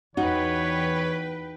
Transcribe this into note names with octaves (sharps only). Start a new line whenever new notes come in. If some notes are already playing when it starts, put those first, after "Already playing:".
E2 D#4 F#4 B4 C#5 G5